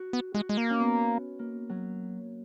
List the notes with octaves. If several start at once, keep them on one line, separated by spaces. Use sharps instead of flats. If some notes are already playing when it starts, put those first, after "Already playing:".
Already playing: F#4
B3
G#3 F#4
G#3
A#3
C#4
B3
A#3
F#3